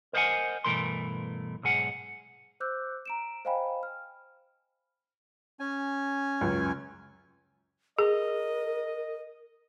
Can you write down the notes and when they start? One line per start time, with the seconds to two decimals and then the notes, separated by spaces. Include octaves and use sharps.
0.13 A#4 C5 D#5 F5 F#5 G#5
0.64 G2 B2 E3 A3 A#4 C6
1.63 B1 G#2 G#4 F#5
2.60 C5 D6 E6 F#6 G6
3.06 A#5 D7 E7
3.45 C5 D#5 F5 G5 G#5 B5
3.83 F6
5.60 C#4 G#5
6.41 C#2 F#2
7.99 G#4 A#4 D#5